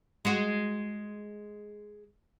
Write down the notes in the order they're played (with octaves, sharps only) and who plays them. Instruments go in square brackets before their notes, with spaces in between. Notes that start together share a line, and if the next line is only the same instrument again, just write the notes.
[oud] G#3 F#4